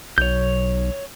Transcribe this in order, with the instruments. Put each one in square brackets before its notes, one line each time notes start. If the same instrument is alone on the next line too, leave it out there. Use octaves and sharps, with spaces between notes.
[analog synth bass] B1 [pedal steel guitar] C#5 G6